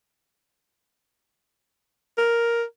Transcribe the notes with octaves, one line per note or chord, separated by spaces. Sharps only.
A#4